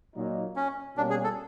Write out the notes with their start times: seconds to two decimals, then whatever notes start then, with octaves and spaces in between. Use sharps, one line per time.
0.15 A#2 F#3 A#3 D#4
0.56 C#4
0.97 B2 G3 A#3 C#4 D4
1.10 G#4
1.24 A4